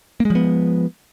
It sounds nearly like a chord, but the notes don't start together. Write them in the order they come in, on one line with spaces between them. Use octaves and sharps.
A#3 G#3 F3 B3